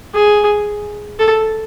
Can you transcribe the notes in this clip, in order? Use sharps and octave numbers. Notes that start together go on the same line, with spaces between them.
G#4
A4